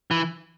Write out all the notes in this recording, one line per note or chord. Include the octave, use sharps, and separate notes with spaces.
E3